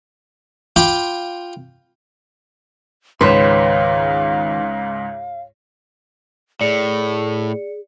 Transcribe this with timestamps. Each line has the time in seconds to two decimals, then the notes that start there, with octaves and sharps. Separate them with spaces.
0.76 F4 G5 B5 D6
3.21 C#2 G#2 D#3 B4 C#5 F5 C6
6.61 A2 G#4 D5 C#7